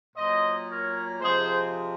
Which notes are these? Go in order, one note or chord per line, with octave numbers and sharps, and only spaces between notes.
A#2 F#3 C5 D#5
A#4 C#5
C3 F3 G#3 G#4 C5